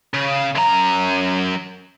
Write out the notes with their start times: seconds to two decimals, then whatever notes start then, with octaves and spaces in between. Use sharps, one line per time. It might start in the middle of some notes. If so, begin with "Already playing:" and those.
0.14 C#3
0.55 F#2 A#5